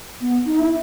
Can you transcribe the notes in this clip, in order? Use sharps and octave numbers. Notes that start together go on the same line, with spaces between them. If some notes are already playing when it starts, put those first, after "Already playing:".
B3
D#4
E4